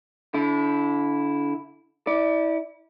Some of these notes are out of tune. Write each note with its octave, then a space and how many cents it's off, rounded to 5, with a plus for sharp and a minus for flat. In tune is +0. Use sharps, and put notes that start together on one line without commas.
D3 -35 E4 +0
E4 -25 D5 +0